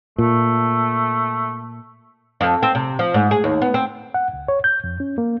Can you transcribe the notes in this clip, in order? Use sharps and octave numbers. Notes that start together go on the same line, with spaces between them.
A#2 A3
F2
C4
C3
F3
G#2
G#4
D#2
B3
C4
F#5
C#2
C#5
G6
F2
C#4
A#3